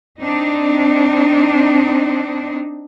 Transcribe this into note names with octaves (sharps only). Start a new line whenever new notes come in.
C4 D4 D#4